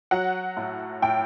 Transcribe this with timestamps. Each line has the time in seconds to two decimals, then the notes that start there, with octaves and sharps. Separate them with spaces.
0.11 F#3 F#5
0.57 A2
1.02 A2 G5